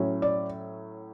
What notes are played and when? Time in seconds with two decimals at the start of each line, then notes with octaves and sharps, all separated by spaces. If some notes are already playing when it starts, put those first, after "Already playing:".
Already playing: A2 F#3 C#4
0.22 D5